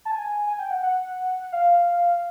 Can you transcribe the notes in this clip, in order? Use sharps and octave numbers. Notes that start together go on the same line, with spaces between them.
A5
G#5
G#5
G5
F#5
F#5
F5